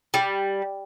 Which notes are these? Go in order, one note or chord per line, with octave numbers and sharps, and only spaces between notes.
G3